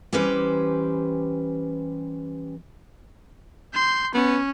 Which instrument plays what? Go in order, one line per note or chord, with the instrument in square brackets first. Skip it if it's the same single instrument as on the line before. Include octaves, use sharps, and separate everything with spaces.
[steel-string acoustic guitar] E3 G3 C#4 G4 B4 C5
[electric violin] C6 G6
[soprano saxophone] B3 [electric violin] C#4